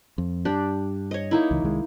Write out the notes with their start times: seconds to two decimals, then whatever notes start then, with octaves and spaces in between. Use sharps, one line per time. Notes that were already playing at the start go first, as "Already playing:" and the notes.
0.18 F2
0.45 G2 D4 G4
1.11 C#5 D#5
1.31 A#3 D#4 E4
1.51 C#2 E3
1.63 C2 D#3 G#3